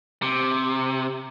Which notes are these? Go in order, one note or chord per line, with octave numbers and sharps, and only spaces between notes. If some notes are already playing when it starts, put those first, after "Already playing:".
C3